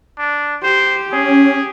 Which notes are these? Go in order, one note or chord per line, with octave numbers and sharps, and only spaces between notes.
D4
G4 C5
C#4 G#4